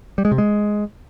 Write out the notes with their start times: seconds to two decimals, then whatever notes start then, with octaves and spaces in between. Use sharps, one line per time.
0.18 G3
0.25 G#3
0.32 C3
0.38 G#3